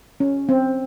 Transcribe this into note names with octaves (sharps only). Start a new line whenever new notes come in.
C#4
C4